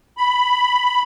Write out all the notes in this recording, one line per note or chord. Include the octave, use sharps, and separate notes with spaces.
B5